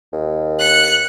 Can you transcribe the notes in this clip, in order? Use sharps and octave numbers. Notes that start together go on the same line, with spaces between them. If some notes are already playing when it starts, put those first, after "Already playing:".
D#2
F#6 C#7